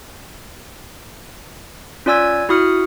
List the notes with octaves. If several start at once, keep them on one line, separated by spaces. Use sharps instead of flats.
C#4 F4 D5 G#5 E6 G#6
E4 F#4 B5 D#6 F6 C#7